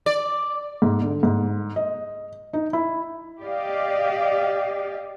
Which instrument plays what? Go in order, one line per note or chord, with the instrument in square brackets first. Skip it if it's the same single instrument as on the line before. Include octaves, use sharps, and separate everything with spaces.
[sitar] D5
[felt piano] G#2
D3
G#2
D#5
D#4
E4
[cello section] G4 D5 D#5 F5